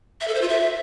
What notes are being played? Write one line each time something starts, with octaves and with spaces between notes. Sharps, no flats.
E5
A4
C5
F4
E5